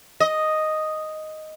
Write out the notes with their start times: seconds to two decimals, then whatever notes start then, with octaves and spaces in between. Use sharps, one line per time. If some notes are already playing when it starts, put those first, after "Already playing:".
0.20 D#5